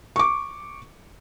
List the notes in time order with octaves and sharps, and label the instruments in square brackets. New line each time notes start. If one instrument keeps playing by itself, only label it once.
[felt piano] C#6 D6